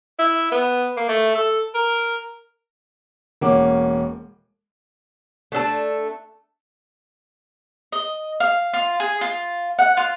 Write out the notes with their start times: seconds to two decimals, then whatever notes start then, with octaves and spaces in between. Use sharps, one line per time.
0.19 E4
0.52 B3
0.97 A#3
1.09 A3
1.35 A4
1.75 A#4
3.41 E1 A#3 C#4 F#5 D6
5.52 A3 D4 A4 A5
7.92 D#5
8.40 F5
8.74 F4
9.00 G#4
9.21 F4
9.79 F#5
9.97 F4